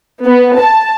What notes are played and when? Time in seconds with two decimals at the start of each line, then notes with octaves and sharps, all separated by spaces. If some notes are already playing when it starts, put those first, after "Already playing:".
0.24 B3
0.57 A5